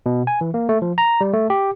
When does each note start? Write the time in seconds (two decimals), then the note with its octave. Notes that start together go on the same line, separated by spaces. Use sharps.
0.06 B2
0.27 G#5
0.41 E3
0.54 A#3
0.69 A3
0.82 F3
0.98 A#5
1.21 G3
1.33 A3
1.50 G4